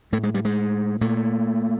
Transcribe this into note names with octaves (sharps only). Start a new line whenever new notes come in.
A2 A3
G#3
G3
G#3
A#2 A3